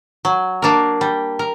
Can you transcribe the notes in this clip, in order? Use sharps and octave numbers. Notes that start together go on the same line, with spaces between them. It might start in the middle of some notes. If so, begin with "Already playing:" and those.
F#3
A#3 D4 A#4
G3
A#4